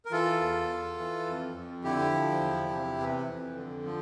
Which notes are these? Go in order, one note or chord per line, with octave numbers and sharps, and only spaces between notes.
A#4
E3 F4 A4
E2
E2
E3
F2
F2
D3 E4 G4
F3
E2
C3
E3
F2
D3
F3